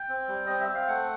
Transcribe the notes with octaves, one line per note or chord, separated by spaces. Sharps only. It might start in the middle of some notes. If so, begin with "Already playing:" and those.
Already playing: G5
C4
G3
C4 D#5
E5
C4
F5
A3 F#5